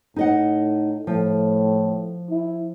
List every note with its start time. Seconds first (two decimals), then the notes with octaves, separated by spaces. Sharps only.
0.16 A2 D#4 D#5 F#5
1.07 A2 F3
2.30 E4